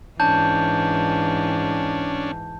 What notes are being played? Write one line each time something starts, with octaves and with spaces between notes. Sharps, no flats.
G#2 E3 C#4 D4 A5 G6